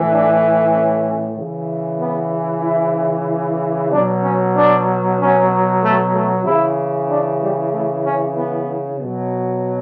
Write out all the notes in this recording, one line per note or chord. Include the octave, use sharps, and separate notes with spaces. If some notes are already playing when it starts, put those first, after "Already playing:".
Already playing: A2 E3
D4
C#4
C#3 E3
B3
E4
B2 F#3 D4
C#4
D4
C#4
A3
A3
C#3 E3 E4
D4
G3
A3
C#4
B3
B2 F#3